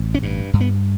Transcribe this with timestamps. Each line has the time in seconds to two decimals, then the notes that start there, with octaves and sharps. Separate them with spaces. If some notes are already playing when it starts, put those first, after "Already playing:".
Already playing: A1
0.15 C#4
0.23 G2
0.53 G2
0.61 B3